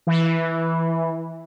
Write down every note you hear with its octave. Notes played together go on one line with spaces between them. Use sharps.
E3